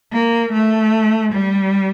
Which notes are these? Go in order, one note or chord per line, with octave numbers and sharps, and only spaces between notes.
A#3
A3
G3